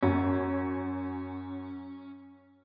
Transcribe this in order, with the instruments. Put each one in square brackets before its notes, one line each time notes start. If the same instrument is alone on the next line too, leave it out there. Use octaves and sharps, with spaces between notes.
[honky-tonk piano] F#2 [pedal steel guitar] C#4